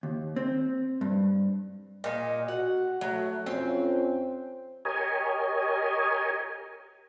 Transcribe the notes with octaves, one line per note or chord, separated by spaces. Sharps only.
D#2
C4
G2
A#2 D#4
F#4 F#5
F#3 A3
F2 C4 C#4
G4 A#4 C#5 D#5 G#5